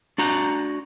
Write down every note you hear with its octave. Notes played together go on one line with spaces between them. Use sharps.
D4 F#4 A#5